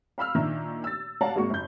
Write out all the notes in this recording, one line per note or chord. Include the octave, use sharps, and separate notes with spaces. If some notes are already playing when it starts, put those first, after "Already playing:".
F5 B5 E6 F6
A#2 D#3 D4 E5 A#5 E6
E6 A6
C#5 D5 F5 F#5 A5 A#5
G#1 G#3 A#3 F#4 C#6
F#1 G6